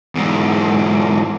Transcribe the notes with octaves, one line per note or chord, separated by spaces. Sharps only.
E2 G#2